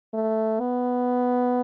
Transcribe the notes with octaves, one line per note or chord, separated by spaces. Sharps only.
A3
B3